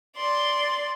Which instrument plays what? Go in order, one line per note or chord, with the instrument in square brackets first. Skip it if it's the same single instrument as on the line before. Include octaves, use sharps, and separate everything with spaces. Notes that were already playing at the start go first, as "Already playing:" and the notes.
[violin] D5 C6